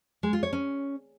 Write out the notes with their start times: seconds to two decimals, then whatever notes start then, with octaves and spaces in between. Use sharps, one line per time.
0.23 G#3
0.33 F4
0.43 C#5
0.53 C#4